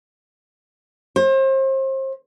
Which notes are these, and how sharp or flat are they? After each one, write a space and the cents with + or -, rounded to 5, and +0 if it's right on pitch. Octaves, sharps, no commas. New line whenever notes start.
C5 +35